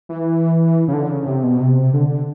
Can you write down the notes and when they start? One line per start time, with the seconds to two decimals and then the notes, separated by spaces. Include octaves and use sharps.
0.09 E3
0.88 C#3
0.93 D3
1.09 C#3
1.26 C3
1.43 B2
1.60 C3
1.93 D3